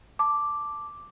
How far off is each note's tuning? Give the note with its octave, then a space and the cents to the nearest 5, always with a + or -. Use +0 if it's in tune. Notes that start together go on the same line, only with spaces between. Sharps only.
A5 +0 D6 +0